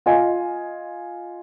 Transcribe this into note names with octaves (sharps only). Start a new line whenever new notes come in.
F4 D#5 G#5